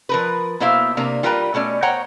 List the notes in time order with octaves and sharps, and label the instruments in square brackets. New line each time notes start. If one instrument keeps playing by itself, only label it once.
[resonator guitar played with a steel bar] F3 A#4 B4
B2 A#3 E4 C5 E5 F5
C3 A#3 D4
G3 F4 A#4 B4 G5 A#5
B2 A3 C#4 D5
C5 C#5 F#5 G5 A#5